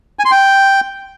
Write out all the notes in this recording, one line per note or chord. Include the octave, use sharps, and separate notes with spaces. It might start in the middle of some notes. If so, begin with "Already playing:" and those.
G#5
C6
G5